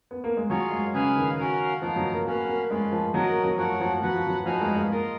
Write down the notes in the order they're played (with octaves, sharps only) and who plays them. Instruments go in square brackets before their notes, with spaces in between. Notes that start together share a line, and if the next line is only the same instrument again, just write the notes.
[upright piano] B3
A#3
G#3
[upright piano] F#3 [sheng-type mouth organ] F4 G#4 C#5 F5
[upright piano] G#3
[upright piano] C#3 [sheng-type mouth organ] G#4 B4 F5 G#5
[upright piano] D#3
[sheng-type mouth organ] C#4 F#4 A#4 F5
[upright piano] F3 [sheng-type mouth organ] B3 D#4 A#4 F5
[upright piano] F#3
A#3
[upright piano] A#3 [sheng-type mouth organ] C#4 F#4 B4 F5
[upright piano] A#3
[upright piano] G#3 [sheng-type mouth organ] C#4 F4 B4
[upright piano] F3
[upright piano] F#3 [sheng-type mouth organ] F#4 A#4 D#5
[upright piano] A#3
F#3
[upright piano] F3 [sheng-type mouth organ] F#4 A#4 C#5 F#5
[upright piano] F3
[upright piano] F#3 [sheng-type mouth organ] F#4 B4 F#5
[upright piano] F3
F#3
[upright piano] F3 [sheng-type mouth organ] D#4 F#4 B4 F5 G#5
[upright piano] G#3
G#3
[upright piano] A#3 [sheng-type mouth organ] F4 A#4 D#5